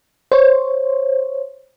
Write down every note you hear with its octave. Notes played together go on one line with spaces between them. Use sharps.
C5 C#5